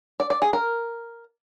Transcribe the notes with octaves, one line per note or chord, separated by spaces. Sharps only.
D5
D5
G#4
A#4